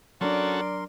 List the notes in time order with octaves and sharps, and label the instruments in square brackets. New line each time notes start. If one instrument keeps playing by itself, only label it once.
[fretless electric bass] F#3 D4 [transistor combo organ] C#4 F#4 A4 [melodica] A#4 C6 [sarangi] D5